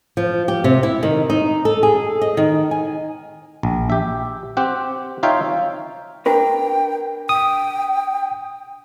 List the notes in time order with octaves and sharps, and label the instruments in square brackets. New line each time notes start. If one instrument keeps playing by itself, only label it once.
[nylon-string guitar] F3
G4
C3
E4
D#3
D#4
A4
G#4
D#5
D#3
G#5
[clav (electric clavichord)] A#1
G4 E5
C4 G4 F#5
D#4 F4 C#5 E5 F5 G5
[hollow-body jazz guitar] D4 A#4 B4 [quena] G5
[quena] G5 [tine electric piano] D#6